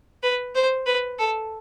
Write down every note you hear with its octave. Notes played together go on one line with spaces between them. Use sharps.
B4
C5
B4
A4